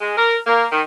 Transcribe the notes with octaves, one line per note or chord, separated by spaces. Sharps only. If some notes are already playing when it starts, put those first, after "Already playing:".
G#3
A#4
A#3
D#3